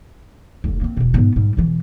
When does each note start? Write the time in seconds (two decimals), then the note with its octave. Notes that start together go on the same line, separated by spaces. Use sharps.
0.64 F1 D#2
0.81 A#3 C4
0.97 E1 B2
1.14 G#2 B3
1.36 G#2 G3
1.57 E1 E3